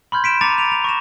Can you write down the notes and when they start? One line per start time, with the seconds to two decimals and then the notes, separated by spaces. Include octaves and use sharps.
0.12 B5 C6 F6 G6 G#6
0.24 B6 D7 E7
0.41 A#5 D6 A6 C#7 D#7 F7
0.58 D7 F7
0.72 F7
0.84 C#6 A#6 E7